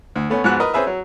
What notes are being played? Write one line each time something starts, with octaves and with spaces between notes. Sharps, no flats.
D2
A3 B3 C#4
G#2 F3 B3 F#4 F#6
A#4 B4 D#5
C4 C#4 G#4 B4 E5
F#3